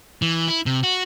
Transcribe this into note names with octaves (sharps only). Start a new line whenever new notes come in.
E3
E4
C3
F#4